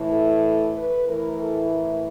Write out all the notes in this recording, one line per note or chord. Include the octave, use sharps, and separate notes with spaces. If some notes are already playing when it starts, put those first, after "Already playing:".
Already playing: A2 E3
A4
B4
A2 E3 A#4
A4
A#4